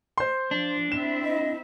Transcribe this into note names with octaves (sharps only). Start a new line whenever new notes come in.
C5 C6
F3 D4
C4 E4 E5 E7
D#5